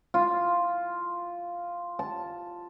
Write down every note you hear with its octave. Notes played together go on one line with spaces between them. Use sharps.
F4
A5